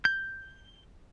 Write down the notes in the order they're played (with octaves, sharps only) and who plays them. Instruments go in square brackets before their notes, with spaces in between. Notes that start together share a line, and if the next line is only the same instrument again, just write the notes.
[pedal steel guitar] G6